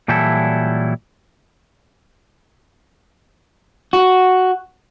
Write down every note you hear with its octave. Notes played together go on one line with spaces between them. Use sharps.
A#2 E3 F#3 G3 E4 A4
F#4